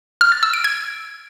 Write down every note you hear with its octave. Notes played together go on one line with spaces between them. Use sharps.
F6
A6
E6
D7
G#6